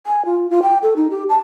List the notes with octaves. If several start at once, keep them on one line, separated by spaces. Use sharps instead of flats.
G#5
F4
F4
G5
A4
D#4
G4
A5